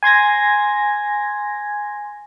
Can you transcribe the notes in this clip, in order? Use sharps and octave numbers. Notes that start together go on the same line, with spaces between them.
G#5 C6 G#6 A#6